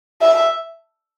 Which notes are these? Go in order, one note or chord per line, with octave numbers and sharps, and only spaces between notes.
E5